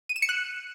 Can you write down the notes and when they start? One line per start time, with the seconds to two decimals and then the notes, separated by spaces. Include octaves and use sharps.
0.09 D#7
0.16 E7
0.22 C#7
0.29 F#6